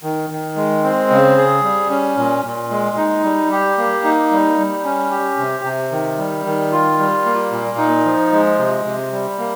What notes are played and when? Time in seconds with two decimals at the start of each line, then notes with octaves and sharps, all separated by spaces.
0.03 D#3
0.30 D#3
0.56 G#3
0.84 C4
1.10 C#3
1.37 G#4
1.63 G3
1.90 C#4
2.17 A#2
2.44 A#2
2.70 G#3
2.97 D#4
3.23 G3
3.51 G4
3.78 A#3
4.04 D#4
4.31 G3
4.58 G3
4.84 C#4
5.10 G4
5.38 C3
5.64 C3
5.91 D#3
6.18 G3
6.45 D#3
6.72 F4
6.99 G3
7.25 A#3
7.52 A#2
7.78 D#4
8.05 F3
8.33 G#3
8.59 C3
8.85 C3
9.13 G3
9.38 A#3